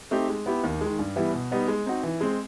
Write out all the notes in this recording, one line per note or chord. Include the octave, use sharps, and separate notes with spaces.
A3 C4 D#4 G4
G#3
B3 E4 G4
D#2
D#3 G#3
G2
E3 G3 B3 E4
B2
G3 B3 D#4
G#3
C4 D#4 F#4
E3
G#3 C4